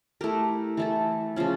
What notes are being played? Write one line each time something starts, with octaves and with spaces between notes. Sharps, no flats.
A3 E4 G4 A#4
E3 A3 E4 A4
C#3 F3 C#4